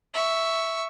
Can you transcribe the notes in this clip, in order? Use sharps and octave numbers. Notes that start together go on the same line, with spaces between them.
E5 C#6